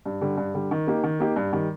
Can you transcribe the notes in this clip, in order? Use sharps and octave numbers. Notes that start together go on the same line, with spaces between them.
G2
D3 G3
G2
D3 G3
D#3
A#3 D#4 G4
D#3
A#3 D#4 G4
G2
D#3 G3